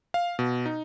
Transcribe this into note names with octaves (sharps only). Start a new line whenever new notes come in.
F5
B2
D#4